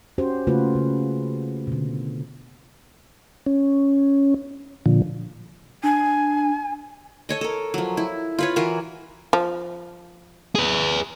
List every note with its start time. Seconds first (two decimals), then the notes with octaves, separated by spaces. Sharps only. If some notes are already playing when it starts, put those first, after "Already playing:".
0.18 C#4 F#4 G4 C5
0.47 C#3 A3 A#3 F4 F#4 B4
0.75 C#3
1.67 B2 D3
3.46 C#4
4.86 A#2 D3 F3
5.83 D4 G#5
7.29 A4 C#5 D#5
7.41 A4 A#4
7.74 F3 F#3
7.97 E4
8.39 F4 B4 C#5
8.56 E3 F4 F#4 A#4
9.33 F3
10.55 G#4 B4